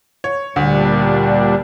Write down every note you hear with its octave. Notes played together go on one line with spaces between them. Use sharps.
C#5
D2 A#2 G3 D4